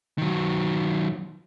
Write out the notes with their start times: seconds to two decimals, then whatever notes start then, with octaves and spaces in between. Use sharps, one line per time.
0.18 D#3 F#3